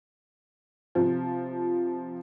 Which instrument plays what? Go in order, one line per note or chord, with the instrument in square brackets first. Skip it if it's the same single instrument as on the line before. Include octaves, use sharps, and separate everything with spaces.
[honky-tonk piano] C3 F3